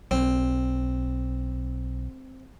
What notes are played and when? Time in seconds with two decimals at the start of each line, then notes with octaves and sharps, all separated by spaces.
0.11 B1 C4